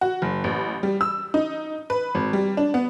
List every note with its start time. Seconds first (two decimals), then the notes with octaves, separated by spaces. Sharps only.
0.01 F#4
0.22 F#1
0.44 A1
0.83 G3
1.01 E6
1.34 D#4
1.90 B4
2.15 G#1
2.33 G3
2.57 D4
2.74 B3